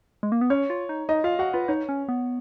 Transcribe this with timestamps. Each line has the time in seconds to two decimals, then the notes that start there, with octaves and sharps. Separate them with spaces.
0.23 G#3
0.32 A#3
0.41 B3
0.50 C#4 C#5
0.70 F4
0.89 D#4
1.09 D#4 D#5
1.24 F4 F5
1.39 F#4 F#5
1.53 F4 B4
1.68 D#4 C#5
1.89 C#4
2.09 B3